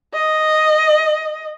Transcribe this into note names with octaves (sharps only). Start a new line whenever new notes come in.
D#5